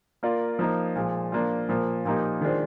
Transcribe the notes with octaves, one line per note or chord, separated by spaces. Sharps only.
A#3 F4 A#4 D5 F5
F3 A#3 D#4
A#2 F3 G#3
F3 A#3 D4 F4
A#2 F3 A#3
A#2 F3 A#3 D#4 G4
D#3 G#3 D4 F4 C5